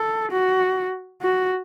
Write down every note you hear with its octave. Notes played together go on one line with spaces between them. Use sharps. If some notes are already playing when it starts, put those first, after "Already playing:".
Already playing: A4
F#4
F#4